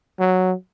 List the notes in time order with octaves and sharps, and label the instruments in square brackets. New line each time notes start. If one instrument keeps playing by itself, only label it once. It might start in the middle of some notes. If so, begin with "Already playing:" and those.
[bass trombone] F#3